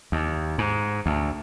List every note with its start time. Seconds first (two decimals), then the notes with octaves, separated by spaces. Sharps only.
0.12 D#2
0.58 G#2
1.06 D2